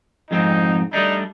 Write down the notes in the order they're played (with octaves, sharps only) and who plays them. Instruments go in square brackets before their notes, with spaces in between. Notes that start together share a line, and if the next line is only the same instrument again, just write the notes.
[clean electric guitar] F2 G#2 C4 [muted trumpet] D#4
[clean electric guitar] G3 A3 D4 [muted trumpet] D#4